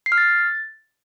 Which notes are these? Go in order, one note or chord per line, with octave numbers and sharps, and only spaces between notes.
C7
F6
A6